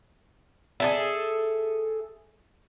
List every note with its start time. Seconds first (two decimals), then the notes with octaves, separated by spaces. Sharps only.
0.80 G#4 A4 E5